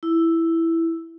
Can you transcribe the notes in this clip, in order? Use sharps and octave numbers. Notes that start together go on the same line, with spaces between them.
E4